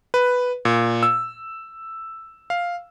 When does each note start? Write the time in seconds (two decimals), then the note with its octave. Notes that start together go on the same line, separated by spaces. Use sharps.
0.14 B4
0.65 A#2
1.03 E6
2.50 F5